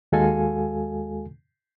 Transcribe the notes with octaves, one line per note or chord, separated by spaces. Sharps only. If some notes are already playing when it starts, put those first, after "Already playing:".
D#2 G#3 F#4 A4 F5 G#5